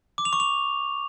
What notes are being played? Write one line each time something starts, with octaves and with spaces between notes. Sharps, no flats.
D6
F7
C#6
F7